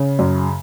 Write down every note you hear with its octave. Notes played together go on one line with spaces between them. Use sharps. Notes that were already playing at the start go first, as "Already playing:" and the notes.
Already playing: C#3
F#2